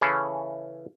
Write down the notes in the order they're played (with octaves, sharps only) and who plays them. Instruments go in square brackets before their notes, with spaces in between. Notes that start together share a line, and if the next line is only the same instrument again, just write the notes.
[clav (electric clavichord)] C#3 E3 C#4 E4 G#4 A4